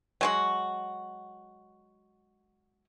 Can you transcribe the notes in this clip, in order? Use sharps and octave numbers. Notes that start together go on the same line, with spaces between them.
F#3 G#3 F#4